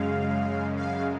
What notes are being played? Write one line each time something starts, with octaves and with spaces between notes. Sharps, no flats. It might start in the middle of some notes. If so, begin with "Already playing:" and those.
Already playing: F#2 C#3 G#3 F5
F5